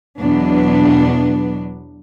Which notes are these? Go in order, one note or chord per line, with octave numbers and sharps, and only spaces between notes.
E2 B2 F#3 B3 D4